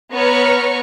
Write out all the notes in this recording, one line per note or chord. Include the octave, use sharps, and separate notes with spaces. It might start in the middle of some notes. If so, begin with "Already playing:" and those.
B3 B4 C#5 A#5 C#6 F6